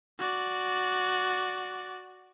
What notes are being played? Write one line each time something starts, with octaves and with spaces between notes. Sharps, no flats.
F#4 D5